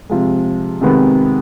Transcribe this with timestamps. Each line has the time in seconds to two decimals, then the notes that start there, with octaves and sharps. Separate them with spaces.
0.10 C3 F3 G#3
0.81 F2 C3 D#3 G#3 B3